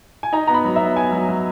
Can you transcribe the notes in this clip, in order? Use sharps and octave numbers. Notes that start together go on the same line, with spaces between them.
G#5
D#4 A#5
B3 A#5
B5
F#3
B3 E5
B3 G#5
F#3
F#3